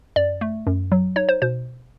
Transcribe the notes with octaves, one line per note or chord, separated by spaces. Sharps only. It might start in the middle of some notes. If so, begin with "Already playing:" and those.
F#2 D5
A3
F#2
F#3
D#4 C#5
C5
B2 C5